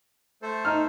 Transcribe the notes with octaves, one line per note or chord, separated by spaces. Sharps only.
A3 A4 C5
D#4 F6